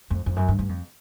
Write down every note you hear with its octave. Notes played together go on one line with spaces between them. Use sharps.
F2
F2
F#2
G2
G2
F2